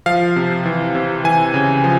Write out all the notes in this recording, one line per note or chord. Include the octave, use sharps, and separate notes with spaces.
F3 F5
C3
E3
C3
E3 G#5
C#3
F3